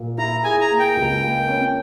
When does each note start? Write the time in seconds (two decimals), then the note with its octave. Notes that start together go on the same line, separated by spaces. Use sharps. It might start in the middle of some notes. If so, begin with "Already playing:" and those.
Already playing: A#2
0.18 E4 A#5
0.44 G#4 G#5
0.61 A#5
0.70 A#3
0.79 G5
0.97 C#2
1.23 A#3
1.48 C#4